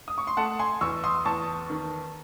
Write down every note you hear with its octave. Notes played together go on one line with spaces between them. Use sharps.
D#6
C#6
C6
A3 F#5 A5
G#5 C6
E2 C#6 E6
C6 D#6
E2 A5 C#6
D#3